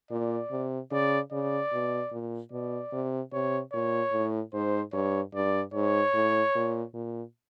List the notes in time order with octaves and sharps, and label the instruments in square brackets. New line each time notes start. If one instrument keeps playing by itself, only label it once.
[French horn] A#2 [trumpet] D5
[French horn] C3
[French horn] C#3 [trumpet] D5
[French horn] C#3 [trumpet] D5
[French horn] B2
A#2
[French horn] B2 [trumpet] D5
[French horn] C3
[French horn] C3 [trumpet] C#5
[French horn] A#2 [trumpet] C#5
[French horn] A2
[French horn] G#2 [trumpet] C5
[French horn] G2 [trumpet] C#5
[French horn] G2 [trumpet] D5
[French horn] G#2 [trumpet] C#5
[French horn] A2
A#2
A#2